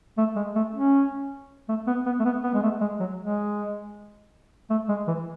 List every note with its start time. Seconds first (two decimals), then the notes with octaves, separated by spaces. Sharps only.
0.18 A3
0.36 G#3
0.55 A3
0.74 C#4
1.69 A3
1.87 B3
2.06 B3
2.20 A3
2.25 B3
2.44 B3
2.54 G#3
2.63 A3
2.81 G#3
3.00 F#3
3.19 G#3
4.70 A3
4.89 G#3
5.07 E3